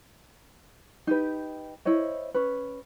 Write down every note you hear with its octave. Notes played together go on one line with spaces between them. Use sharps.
D#4 G4 B4
E4 C5 C#5 D#5
C#4 B4